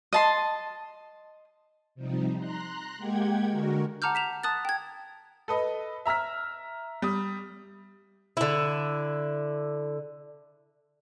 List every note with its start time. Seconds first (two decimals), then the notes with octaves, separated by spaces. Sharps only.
0.13 D#5 A5 C6
1.95 C3 F3 G3 D#4
2.36 A#5 C6 F#6
2.98 G#3 A#3 G4 F#5 G5 G#6
3.49 D3 G#3 F#4 A#4
4.02 F#5 A5 A#5 D6 F6 G6
4.15 B6 E7 F7
4.43 A5 D#6 F#6 A6
4.65 G5 G#6
5.48 A4 B4 D#5
6.06 E5 A#5 E6 F6 B6
7.02 G3 D#6
8.37 D3 E4